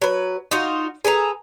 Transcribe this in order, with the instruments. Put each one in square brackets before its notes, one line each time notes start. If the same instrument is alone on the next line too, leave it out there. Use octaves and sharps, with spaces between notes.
[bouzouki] F#3 B4
D#4 F4 F#4
G#4 A4 B4 A#5